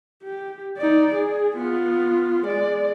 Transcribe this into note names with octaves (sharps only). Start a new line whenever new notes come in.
G4
D#4 D5
G#4
B3 F4
G#3 D5